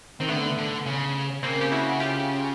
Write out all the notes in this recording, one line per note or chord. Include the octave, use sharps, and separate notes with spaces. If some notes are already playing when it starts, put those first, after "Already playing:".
D#3 C4
D3 A3 B3
D3
C#3
C#3 A#3 C4
G4
E4 F#4
F4 G4